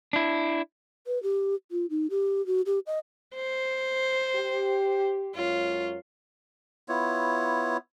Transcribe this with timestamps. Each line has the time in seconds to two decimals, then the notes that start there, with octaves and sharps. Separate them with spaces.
0.13 D4 E4
1.07 B4
1.23 G4
1.71 F4
1.90 D#4
2.10 G4
2.46 F#4
2.66 G4
2.87 D#5
3.35 C5
4.36 G4
5.36 F#2 G#3 F4 C#5
6.88 B3 E4 F4 C#5